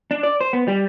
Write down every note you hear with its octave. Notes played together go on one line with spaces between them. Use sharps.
D4
D5
C5
B3
G3